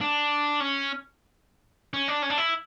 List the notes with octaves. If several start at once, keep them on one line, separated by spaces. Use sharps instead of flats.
D4
C#4
C#4
D4
C#4
D4
E4